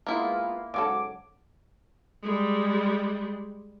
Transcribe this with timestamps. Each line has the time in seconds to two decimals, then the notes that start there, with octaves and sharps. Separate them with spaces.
0.07 G#3 A#3 B3 E4 F4
0.74 G#2 C#3 F#3 A4 D6
2.23 G3 G#3